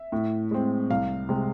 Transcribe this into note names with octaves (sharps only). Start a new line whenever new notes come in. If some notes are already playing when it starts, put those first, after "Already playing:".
Already playing: E5
A2
G#3 C4
C2 F5
C3 G#3